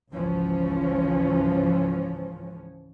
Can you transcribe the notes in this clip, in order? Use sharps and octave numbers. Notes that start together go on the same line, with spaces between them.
G#1 C#2 E3 F3 C#4